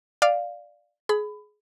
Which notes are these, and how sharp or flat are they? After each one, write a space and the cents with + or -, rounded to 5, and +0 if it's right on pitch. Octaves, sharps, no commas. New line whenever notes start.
D5 +5 F5 +0
G#4 +20 B5 +20